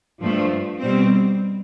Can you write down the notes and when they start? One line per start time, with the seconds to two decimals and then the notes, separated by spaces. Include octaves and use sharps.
0.21 G2 F3 A3
0.79 B2 G3 C4